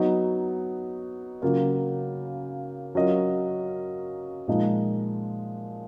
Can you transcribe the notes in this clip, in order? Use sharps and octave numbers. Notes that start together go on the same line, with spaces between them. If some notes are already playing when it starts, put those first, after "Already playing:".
Already playing: F#3 B3 D#4 F#4
C#3 F#3 A#3 F4
F#3 C#4 F4 A#4 D#5
A#2 F3 G#3 D#4